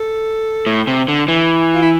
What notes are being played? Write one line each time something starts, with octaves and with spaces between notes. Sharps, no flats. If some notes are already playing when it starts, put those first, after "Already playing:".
Already playing: A4
A2
C3
D3
E3
F4
E4